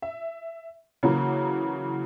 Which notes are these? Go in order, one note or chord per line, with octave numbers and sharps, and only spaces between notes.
E5
C#3 E3 F#3 A#3